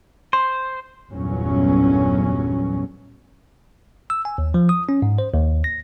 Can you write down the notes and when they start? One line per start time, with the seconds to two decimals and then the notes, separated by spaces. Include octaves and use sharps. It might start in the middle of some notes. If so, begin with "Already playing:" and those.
0.33 C5 C6
1.12 G1 E2 A#2 F#3 C#4
4.10 E6
4.25 G#5
4.38 D#2
4.54 F3
4.69 D#6
4.89 C#4
5.02 G#2
5.18 C5
5.33 D#2
5.64 A#6